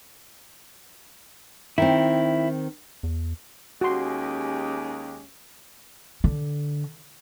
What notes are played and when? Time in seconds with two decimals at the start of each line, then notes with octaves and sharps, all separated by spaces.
1.78 D#3 C4 E4
3.03 E2
3.81 D#2 G#3 C#4 F#4 G4 C6
6.24 D3